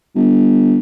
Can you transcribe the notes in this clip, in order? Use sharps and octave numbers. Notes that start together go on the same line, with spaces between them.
G1